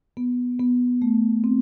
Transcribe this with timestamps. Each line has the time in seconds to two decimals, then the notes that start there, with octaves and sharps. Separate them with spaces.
0.17 B3
0.59 B3
1.02 A3
1.44 C4